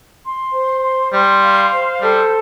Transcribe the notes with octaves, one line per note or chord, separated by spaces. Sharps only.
C6
C5
C6
G3 C6
F5
C5
G3 A4